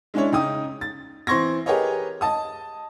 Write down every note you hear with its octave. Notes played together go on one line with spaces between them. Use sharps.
G#3 C#4 D4 E4 C#5
C#3 D#4 G5 D#6
A6
E3 C4 C6 C#6 G#6 A#6
G4 G#4 A#4 B4 C#5 D#5
D#5 A5 D#6